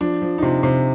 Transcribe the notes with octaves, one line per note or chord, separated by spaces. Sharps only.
F3 D4
F3
D#4
C3 F4
C3